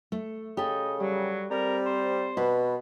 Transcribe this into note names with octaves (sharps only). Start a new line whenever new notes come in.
A3
C#3 G4 A4 D#5
F#3 G3
G3 C4 A#4
C5
B2 B4